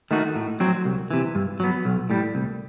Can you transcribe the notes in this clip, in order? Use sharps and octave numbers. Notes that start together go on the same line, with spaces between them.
D#3 A3 D#4 F#4
A2
F#3 C4 F#4
C2
C3 E3
G2
F#3 B3
B1
A2 G3
C2